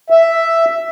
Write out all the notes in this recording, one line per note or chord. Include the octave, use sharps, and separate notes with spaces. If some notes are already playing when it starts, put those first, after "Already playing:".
E5